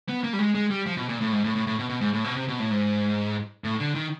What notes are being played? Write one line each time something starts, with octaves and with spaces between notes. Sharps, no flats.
B3
A#3
G3
G#3
G#3
G3
F3
B2
A#2
A2
G#2
A2
A2
A2
B2
B2
G#2
A2
B2
C3
B2
A2
G#2
A2
D3
D#3